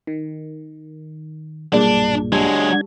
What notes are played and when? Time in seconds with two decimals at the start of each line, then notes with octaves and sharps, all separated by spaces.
0.07 D#3
1.73 B1 G2 A#2 D4 G#4 D5
2.32 F#3 G#3 D4 G4 A5 E6 G#6